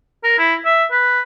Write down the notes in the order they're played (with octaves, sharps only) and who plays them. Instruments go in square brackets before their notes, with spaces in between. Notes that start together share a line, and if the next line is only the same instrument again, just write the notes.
[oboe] A#4
E4
E5
B4